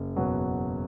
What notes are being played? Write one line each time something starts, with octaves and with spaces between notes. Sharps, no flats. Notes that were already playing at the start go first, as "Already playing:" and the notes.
Already playing: F#1
E2 B2 F#3